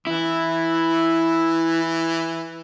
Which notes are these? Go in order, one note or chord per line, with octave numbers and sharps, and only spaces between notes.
E3 E4